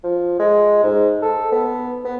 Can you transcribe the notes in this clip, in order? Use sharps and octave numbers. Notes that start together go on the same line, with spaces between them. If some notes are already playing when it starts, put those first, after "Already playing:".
F3
G#3
G#2
A4
B3
B3